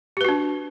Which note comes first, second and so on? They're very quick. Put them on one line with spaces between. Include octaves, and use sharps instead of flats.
G4 B4 F#4 D4